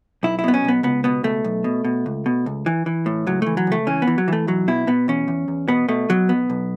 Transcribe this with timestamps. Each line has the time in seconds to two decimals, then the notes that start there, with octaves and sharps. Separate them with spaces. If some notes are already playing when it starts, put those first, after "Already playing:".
0.23 B1 E4
0.39 E4
0.44 B2 B3
0.54 C#4
0.65 B1 B3
0.83 C#2 B3
1.04 B2 B3
1.24 C#2 A3
1.44 B1
1.64 B2
1.85 B2
2.06 C#2
2.26 B2
2.46 C#2
2.66 E3
2.86 E3
3.06 A2
3.27 C#2 F#3
3.42 E3 A3
3.57 F#3
3.67 C#2 A3
3.87 E3 C#4
4.02 B3
4.07 E3
4.18 F#3
4.28 E3 A3
4.47 B1 F#3
4.68 B2 E4
4.87 B2 B3
5.08 E2 C#4
5.28 E2
5.48 E2
5.68 B2 B3
5.88 B2 A3
6.09 B2 F#3
6.29 B1 B3
6.50 B1